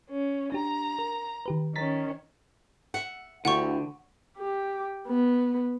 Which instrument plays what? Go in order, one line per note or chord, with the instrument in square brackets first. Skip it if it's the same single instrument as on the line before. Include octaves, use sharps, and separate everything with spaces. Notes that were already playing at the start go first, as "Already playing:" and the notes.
[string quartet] C#4
[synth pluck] D4 G4 [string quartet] A#5
[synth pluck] A#4
D#3 G4 B4
[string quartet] D#3 C#4 [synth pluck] A#5 A6 B6
[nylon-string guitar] E5 F#5
[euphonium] D2 [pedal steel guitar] D3 [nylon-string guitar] E4 F4 G4 [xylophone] F#5 C#6
[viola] G4
B3